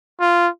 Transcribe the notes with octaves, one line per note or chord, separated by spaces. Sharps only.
F4